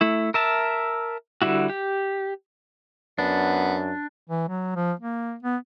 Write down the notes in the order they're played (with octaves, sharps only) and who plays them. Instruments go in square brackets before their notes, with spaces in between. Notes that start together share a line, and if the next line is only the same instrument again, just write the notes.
[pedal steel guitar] A3 E4
A#4 E5 A5
D3 G3 E4 F#4
G4
[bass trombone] F#2 [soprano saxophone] B3 [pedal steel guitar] D4
[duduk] E3
F#3
F3
A#3
B3